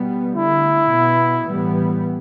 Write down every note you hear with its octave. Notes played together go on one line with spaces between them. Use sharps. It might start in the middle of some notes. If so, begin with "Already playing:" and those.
Already playing: B2 G3 B3
D3 A3 E4
B2 B3
A2 E3 G3 B3